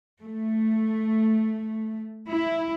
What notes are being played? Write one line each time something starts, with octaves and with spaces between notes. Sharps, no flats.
A3
E4